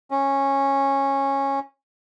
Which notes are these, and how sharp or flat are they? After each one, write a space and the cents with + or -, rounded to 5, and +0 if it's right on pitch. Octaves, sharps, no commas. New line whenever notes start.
C#4 -15